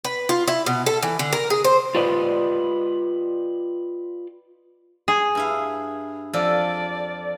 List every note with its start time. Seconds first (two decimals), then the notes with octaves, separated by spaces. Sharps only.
0.05 B4
0.29 F4
0.48 E4
0.66 B2
0.86 A4
1.03 E3
1.19 D3
1.32 A#4
1.50 G#4
1.64 C5
1.95 F4 G4 B4 D5 D#5
5.08 G#4
5.35 G2 E4 F5
6.33 F2 F3 A4 D5